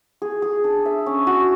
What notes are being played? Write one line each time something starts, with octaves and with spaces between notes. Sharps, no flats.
G#4
G#4
D4
E5
C#4
F#4